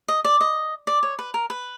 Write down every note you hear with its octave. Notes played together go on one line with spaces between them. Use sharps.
D#5
D5
D#5
D5
C#5
B4
A#4
B4